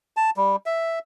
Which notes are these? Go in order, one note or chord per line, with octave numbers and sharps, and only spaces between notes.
A5
G3
E5